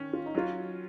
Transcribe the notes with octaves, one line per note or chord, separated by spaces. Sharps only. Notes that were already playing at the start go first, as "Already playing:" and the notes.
Already playing: D#3 C#4
F4
D#4
F#3 F4